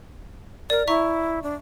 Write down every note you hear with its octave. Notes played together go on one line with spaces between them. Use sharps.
A#4 D5
E4 E5 A#5 C#6
D4